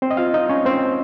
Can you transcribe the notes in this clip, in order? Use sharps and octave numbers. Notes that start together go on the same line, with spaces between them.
C4 C5
D#5
F4 F5
D#4 D#5
C#4 C#5
C4 C5